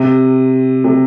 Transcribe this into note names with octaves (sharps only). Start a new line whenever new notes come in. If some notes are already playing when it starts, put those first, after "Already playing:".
Already playing: C3
C3